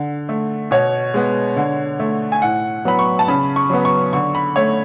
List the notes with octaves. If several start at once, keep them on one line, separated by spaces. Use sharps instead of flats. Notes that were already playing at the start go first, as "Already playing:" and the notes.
Already playing: D3
A3
B2 C#5
G#3 B3
D3
A3
G#5
A2 F#5
F#3 B3 B5
C#6
A5
C#3 B5
C#6
F#3 B3
C#6
D3 C#6
B5
A3 C#5